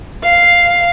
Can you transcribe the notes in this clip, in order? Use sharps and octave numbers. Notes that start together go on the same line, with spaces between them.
F5